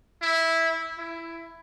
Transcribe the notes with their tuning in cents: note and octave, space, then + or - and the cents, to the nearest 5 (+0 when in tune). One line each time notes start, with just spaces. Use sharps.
E4 -10
E4 +10